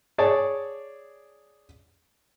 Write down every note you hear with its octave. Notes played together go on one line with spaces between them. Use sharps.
G#4 C#5 D5 A5